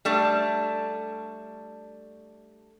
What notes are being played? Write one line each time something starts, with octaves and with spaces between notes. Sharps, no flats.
G3 A3 D4